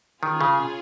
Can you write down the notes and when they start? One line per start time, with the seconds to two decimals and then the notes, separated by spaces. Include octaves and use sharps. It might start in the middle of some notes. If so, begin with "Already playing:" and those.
0.23 D#3 C#4 F4 G#4
0.41 C#3